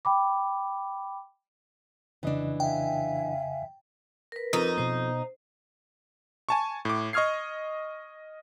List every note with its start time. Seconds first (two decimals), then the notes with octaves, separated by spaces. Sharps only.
0.05 G5 B5 D6
2.23 F2 C#3 E3 D4 D#5
2.60 E5 F5 G5 G#5
4.32 A#4 B4
4.53 F2 D#4
4.78 B2 B3 C5
6.49 G#5 A5 C#6
6.85 A2 D6
7.13 D#5 C#6 D#6 F6 G#6 C7